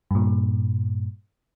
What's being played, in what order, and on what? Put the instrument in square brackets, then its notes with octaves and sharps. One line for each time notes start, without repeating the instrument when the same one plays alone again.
[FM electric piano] G2 A#2